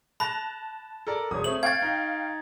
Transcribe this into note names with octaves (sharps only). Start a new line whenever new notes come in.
A5 B5 F#6 A#6
A4 A#4 D5
E1 C#5 D#6
A3 C4 F#7
F5 G5 C#6 G#6 A6
D#4